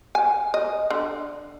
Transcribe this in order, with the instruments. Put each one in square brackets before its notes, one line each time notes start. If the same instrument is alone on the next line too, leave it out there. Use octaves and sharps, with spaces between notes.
[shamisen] G#5
D#5
D3